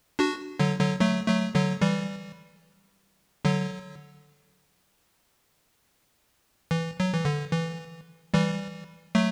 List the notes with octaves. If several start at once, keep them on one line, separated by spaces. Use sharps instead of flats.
D4 F#4
D3 F#3
D3 F#3
F#3 A3
F#3 A3
D3 F#3
E3 G3
D3 F#3
E3
F#3
E3
D3
E3
E3 G3
F#3 A3